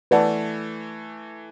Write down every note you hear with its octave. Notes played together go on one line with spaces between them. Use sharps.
E3 A3 B4 D5 F#5 A5